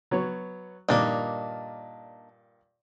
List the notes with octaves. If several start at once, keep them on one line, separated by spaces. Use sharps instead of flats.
F#3 B3 C#5
G2 A#2 D#3 A#3 D4 D#4